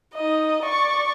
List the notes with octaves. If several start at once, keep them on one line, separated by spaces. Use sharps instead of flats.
D#4 D#5
D5 C#6